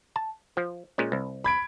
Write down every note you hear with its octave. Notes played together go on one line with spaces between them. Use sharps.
A5
F3
A#2 G#3 C#4
C2
B5 G#6 D7